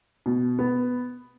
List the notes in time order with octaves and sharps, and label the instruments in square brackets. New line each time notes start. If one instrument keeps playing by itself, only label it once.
[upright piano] B2
B3